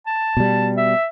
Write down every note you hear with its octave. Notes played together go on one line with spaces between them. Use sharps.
A5
B2 G3
E5